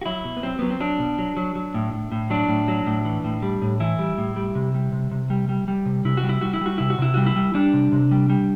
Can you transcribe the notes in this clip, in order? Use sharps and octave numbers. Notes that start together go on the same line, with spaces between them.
F#4
F#3 E4
B2
B3
F#3 C4
F#3 B3
C4
F#3 D4
B2
F#3
F#3
F#3
A2
A2
A2
F#3 D4
A2
F#3
A2
E3
A2
G3
A2
E3 E4
G3
A2
G3
C3
G3
C3
C3
G3
G3
G3
C3
C3 E4
F#4
G3
E4
G3 F#4
E4
G3 F#4
C3 E4
F#4
C3 E4
G3 F#4
E4
G3
G3 D4
C3
C3
G3
G3